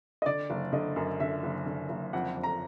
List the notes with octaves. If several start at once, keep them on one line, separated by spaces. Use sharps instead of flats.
D#5
D3 D5
F#1
D3 D#5
F#2
D3 E5
F#1
D3
F#1
F2 F#5
F2
A#5